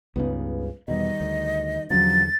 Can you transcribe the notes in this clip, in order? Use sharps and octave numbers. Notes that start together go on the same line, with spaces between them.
C#2 G2 C#3 B3 D#4
E2 B2 D#3 G3 D#5
D2
E2 D3 F3 F#3 C#4 A6